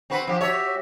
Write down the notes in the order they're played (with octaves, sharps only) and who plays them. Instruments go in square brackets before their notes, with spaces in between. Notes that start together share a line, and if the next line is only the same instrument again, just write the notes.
[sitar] C4 F#4 B4
F3 G4
[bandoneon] F#4 G4 E5 [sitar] C#5